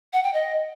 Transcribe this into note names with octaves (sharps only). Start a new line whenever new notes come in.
F#5
G5
D#5